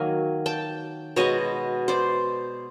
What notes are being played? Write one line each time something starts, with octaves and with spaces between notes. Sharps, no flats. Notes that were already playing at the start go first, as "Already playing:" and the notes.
Already playing: D#3 F#3 A#3 G#5
G5 A5
B2 G#3 B3 C#5 D#5
C5 D5